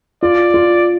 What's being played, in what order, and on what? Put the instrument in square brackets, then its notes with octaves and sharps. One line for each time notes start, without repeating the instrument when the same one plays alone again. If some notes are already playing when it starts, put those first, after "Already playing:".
[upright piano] F4 [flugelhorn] D5
[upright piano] F4